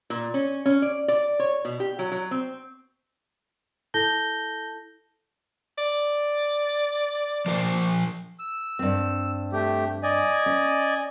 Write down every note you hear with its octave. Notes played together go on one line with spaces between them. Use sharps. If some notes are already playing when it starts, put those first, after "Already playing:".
A#2
C#4
C#4
D5
D5
C#5
B2
G4
F#3
F#3
C4
E4 A4 A5 G6 A#6 G7
D5
F3 A#4 C5
E6
G2 C4
A3 G4
D5 D#5 G#5
C#4